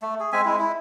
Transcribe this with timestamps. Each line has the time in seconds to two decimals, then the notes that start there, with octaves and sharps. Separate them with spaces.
0.02 A3
0.20 G#4
0.32 G#3 C4 E5 G#5
0.45 G#3 E4
0.59 E4